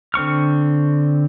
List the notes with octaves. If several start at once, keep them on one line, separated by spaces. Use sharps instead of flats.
D3 C4 C#6 F6